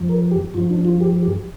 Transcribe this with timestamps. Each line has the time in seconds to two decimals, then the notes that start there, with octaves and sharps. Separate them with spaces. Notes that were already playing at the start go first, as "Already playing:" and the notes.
Already playing: F2 F3
0.09 A#4
0.31 G4
0.54 G2 F4
0.57 F3
0.70 D4
0.85 F4
1.01 G4
1.23 G4